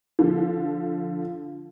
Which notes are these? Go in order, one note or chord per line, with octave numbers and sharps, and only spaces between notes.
D3 F3